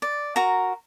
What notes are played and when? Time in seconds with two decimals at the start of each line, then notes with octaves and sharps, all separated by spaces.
0.02 D5
0.36 F#4 A#4 A#5